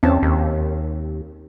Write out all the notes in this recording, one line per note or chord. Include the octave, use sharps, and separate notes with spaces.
E2 C4 C#4 A5
D#2